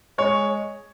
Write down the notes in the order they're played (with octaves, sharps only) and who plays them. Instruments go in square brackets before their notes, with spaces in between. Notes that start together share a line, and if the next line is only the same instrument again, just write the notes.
[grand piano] G#3 C#5